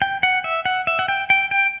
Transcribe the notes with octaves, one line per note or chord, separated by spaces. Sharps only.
G5
F#5
E5
F#5
E5
F#5
G5
G5
G5